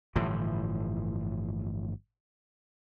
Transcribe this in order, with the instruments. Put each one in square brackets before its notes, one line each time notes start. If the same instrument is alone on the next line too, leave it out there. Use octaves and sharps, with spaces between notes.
[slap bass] G1 A2 E3 F3